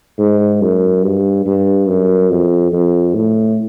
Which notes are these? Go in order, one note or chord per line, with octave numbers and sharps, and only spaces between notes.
G#2
F#2
G2
G2
F#2
F2
F2
A2